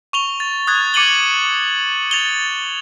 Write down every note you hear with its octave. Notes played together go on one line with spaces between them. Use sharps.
C#6 F7 G7
A6
D#6 F#6 G#6 A6
D6 C#7 D#7 F#7 G7
A6 F7 G7